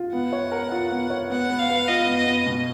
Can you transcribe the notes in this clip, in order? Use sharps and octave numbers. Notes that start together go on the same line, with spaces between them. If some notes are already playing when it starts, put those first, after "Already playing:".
Already playing: F4
B3 F#5
C#5
A#4
F4
B3
C#5
B3 F#5
B3
F5
B4
F4 D#5
B3
D#5
B3
B2